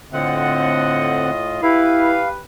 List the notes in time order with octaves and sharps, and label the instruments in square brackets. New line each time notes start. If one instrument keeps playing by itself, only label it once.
[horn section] A2 F4 D#5 [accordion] D3 C4 F#5
[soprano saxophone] E4 [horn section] G4 B4 [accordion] F5